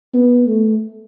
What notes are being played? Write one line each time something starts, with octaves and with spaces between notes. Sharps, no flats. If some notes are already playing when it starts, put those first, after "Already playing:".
B3
A3